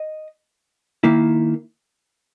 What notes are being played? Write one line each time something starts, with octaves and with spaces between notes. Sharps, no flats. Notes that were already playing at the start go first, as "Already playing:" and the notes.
Already playing: D#5
D#3 A#3 E4